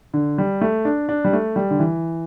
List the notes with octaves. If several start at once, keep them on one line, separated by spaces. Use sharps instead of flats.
D3
G3
A3
D4
D4
G3
A3
G3
D3
E3